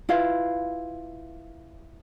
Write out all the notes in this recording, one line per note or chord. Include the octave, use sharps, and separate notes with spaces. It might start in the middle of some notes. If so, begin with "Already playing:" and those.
E4 F4 B4 F5